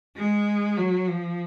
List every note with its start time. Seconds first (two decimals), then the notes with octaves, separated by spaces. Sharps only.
0.17 G#3
0.77 F#3
1.08 F3